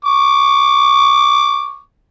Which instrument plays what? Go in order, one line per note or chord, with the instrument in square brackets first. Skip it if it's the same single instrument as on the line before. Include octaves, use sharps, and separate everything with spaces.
[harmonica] C#6 D6